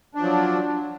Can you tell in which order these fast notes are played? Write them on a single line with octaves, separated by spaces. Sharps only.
D4 F3 F#3